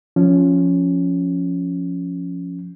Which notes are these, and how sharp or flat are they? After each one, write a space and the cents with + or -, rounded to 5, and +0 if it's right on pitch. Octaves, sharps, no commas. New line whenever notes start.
F3 +5 C#4 +0